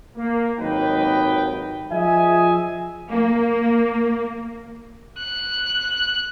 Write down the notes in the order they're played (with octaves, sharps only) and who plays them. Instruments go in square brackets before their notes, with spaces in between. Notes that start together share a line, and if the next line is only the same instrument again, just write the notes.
[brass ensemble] A#3
G#1 D#2 F#3 D#4 B4 G5
F3 G#4 D#5 E5 G#5
[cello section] A#3
[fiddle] F#6